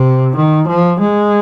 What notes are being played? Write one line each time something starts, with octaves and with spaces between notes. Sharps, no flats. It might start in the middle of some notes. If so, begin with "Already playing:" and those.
Already playing: C3
D#3
F3
G#3